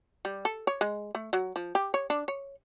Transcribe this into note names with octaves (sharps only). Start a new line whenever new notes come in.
G3
A4
C#5
G#3
A3
F#3
F3
G4
C#5
D4
C#5